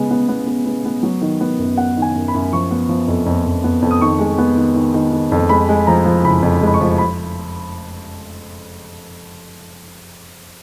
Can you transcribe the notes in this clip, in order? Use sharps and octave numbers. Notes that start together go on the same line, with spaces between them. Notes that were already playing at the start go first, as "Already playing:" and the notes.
Already playing: C#3 G#3 B3
B3
B3
B3
B3
B3
F#3
D#3
B3
F#2
B3 F#5
D#3
G#5
F#2
B5
F#2
F3 C#6
B3
F3
F2
F2
F2
B3
F2
D#6
D#3 C#6
G#3
B3
D#3
D#3
D#3
D#3
F2
G#3 B5
G#3
F3 A#5
F3
F#1 B5
F2
G#3
B5
C#6
F3
B5